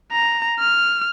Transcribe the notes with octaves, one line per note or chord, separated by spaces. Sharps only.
A#5
F6